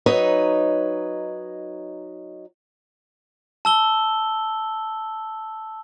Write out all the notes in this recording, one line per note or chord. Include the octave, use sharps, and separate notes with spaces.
F#3 D#4 B4 C#5 D#5
A5 E6 G7